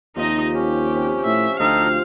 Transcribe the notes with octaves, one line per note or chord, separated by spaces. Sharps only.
D#2 C3 F3 D#4 D#5
C#4 G4
C3
A2 E5
D2 F3 D#4 G4 A4 D#5 F5